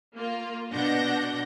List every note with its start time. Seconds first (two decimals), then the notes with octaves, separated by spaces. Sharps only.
0.15 A#3 F4
0.72 B2 D4 F#5 G6 A#6